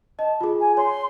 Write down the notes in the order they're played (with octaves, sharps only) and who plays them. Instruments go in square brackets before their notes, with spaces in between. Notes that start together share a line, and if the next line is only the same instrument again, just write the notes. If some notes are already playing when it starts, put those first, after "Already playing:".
[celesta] D#5 [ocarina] A5
[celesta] F4 G#4
[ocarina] G#5
[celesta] C#5 [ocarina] C6